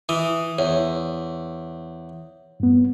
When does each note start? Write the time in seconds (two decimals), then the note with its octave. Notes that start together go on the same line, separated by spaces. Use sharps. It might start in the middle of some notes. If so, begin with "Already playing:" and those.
0.09 E3 D#6
0.59 E2 C#5
2.60 G2 B3